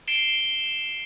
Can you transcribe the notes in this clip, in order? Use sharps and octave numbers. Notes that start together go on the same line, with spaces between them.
C7 D7 E7 G7